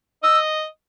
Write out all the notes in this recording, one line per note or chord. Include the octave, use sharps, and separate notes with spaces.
D#5 E6